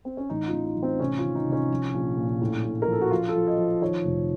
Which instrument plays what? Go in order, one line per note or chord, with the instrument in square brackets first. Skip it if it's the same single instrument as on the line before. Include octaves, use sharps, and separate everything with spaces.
[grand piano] C4
C#4
A1 D#4
F4
A1
D#4
A1
C4
C3 C#4
F4
D#3
D#4
C2
C#4
F3
A#1
A#2
A2
A2
A#4
F3
A4
F#4
F3 F4
A4
F3
D#5
F3
D#3 C#5
F1